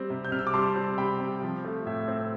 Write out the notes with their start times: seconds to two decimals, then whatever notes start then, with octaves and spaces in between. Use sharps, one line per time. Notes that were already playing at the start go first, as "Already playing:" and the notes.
Already playing: G3 C4
0.10 C3
0.25 G6
0.32 C3 F6
0.39 E6
0.47 D6
0.54 G3 A5 C6
0.76 C4
0.98 C3 G5 B5
1.20 C3
1.43 F3
1.65 A3
1.86 A2 E5
2.08 C4